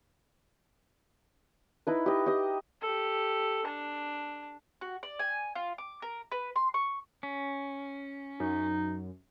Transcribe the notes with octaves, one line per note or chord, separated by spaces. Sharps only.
D#4 E4 B4
G4 D#5
G4 D#5
G4 A4
D4 A5
F#4
D5
G#5
F4
D6
A#4
B4
C6
C#6
C#4
F#2 D#4